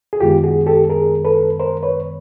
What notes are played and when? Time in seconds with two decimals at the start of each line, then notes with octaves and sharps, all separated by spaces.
0.13 G#4
0.20 F#2 D#3 G#3 B3 F4 G4
0.44 F#4 G#4
0.66 G4 A4
0.90 G#4 A#4
1.25 A4 B4
1.60 A#4 C5
1.83 B4 C#5